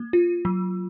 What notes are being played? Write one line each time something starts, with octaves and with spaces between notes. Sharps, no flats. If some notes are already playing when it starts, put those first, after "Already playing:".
Already playing: A#3
F4
F#3